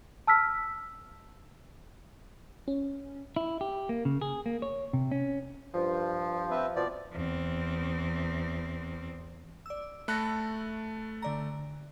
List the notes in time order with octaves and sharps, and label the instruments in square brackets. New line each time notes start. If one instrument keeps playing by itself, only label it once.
[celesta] A5 E6 F6 B6
[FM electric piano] C#4
[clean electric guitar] E4
G4
A#3
C#3
G#4
A#3
C#5
C3
C#4
[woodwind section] G2 F3
[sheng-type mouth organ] C4 B4 E5
[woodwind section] B2 F3 [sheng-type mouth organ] D5
[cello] E2 C4
[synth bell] D5 E6
[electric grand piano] A3 A4 F#6 [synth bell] B5 A#6
[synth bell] D3 D5 A#5